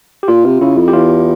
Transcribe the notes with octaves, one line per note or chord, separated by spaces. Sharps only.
G4
A#2 F4
C3
C#3 E4
F2
G4
E2 F4